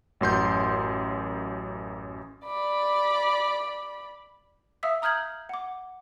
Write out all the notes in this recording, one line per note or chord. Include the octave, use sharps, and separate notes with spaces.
A1 F#2 C6 G6
D5 B5
E5 F5 D#6 E6 B6
A#5 D#6 F6 G6 G#6 F#7
F#5 D6